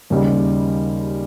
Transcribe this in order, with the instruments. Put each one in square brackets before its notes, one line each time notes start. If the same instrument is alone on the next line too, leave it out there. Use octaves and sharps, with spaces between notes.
[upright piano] D#2 C#3 G3